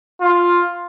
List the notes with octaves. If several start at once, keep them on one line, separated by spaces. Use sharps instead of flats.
F4